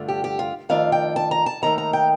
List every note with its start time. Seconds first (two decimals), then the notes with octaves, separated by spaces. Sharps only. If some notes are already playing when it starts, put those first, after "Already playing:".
Already playing: G2 D3 A3 D4 F4
0.08 G4
0.24 G4
0.39 F4
0.69 F2 D#3 A3 D4 F4 F5
0.92 G5
1.16 A5
1.31 A#5
1.46 A5
1.62 D#2 D#3 A3 A#5
1.78 A#5
1.93 G5